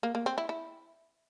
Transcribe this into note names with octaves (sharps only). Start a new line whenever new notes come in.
A#3
A#3
C4
E4
E4